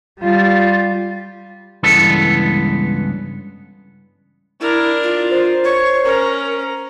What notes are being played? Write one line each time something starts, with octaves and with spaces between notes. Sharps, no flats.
G3 F4
C#2 G2 E3 G#3 B3 A4
D4 E4 A#4
F4
C5
C#5 C#6
C#4 A#4 A#5